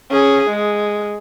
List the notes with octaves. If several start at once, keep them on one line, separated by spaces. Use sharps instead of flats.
C#4 G#4
G#3